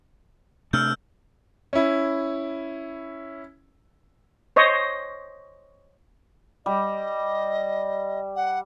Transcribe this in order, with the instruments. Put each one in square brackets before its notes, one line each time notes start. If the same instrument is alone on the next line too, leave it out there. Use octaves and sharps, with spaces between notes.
[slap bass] C3 A3 D4 [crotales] E6 F6 G6
[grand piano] C#4 E4
[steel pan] C5 C#5 D#5
[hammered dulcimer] G3 [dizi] D#5
[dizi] F#5